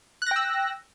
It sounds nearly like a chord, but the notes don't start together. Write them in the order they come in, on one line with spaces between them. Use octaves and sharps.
F#6 A#6 G5 E6